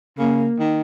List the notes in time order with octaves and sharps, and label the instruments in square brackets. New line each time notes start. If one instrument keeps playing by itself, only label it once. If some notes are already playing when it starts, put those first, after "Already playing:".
[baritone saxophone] C#3 [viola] A#3
[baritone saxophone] D#3